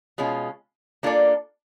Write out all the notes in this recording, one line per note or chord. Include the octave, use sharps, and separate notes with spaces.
B2 G#3 C#4 F4
A#3 D4 F4 A4 D5